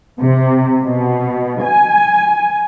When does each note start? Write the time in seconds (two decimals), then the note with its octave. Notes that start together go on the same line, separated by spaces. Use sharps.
0.19 C3
0.83 B2
1.63 G#5